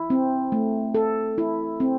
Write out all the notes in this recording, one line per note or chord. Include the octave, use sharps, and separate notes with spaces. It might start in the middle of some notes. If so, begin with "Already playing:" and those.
Already playing: E4
C4
A3
A4
E4
C4